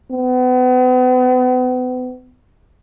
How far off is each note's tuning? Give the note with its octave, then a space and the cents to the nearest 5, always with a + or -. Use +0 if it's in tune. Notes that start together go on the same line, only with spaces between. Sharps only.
B3 +40